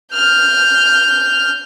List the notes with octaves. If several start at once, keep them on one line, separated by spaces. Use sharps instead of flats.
F6 G6